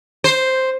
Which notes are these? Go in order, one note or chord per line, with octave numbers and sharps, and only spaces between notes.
C5